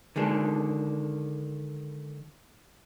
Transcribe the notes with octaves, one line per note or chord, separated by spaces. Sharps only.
D3 D#3 G#3 D4